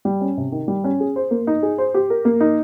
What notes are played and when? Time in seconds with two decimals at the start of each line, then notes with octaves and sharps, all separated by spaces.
0.05 G3
0.21 C#4
0.37 C3
0.52 D#3
0.68 G3
0.84 C#4
1.00 G#4
1.16 C5
1.31 A#3
1.47 D#4
1.63 G#4
1.78 C5
1.94 G4
2.10 A#4
2.25 A#3
2.41 D#4